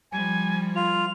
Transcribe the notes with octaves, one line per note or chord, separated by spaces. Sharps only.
F3 G3 G#5
F4 F7